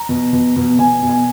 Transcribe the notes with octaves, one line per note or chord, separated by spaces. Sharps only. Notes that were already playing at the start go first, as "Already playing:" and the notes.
Already playing: A#5
B2
B2
B2
B2 G#5
B2
G#5